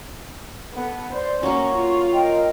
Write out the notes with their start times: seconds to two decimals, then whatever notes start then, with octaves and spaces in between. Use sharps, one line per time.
0.74 B3 A4 F#5
1.13 C5 D5
1.43 F#3 A#3 C#4 C#6
1.75 F4
2.13 A#4 D#5 G5